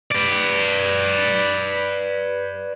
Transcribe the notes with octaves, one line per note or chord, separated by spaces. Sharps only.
B4 D5